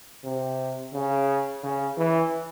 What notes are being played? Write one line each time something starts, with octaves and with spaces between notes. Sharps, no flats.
C3
C#3
C#3
E3